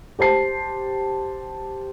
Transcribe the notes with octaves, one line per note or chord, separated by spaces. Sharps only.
G4 C5 A5 C7